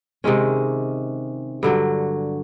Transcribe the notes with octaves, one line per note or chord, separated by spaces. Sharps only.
C3 D#3 G#3 C#4
G2 D3 F#3